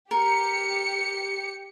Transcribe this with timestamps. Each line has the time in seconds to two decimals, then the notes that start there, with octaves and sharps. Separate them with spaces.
0.11 G4 A#4 C#7